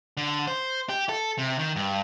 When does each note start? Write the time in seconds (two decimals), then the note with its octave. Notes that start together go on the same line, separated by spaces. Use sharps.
0.17 D3
0.48 C5
0.89 G4
1.09 A4
1.38 C3
1.59 D#3
1.76 G2